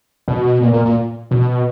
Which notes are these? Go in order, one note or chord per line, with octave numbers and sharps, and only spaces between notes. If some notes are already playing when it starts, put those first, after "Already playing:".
B2
A#2
A#2
A#2
B2